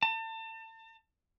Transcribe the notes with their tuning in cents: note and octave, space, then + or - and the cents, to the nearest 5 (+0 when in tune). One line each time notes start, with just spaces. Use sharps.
A5 +35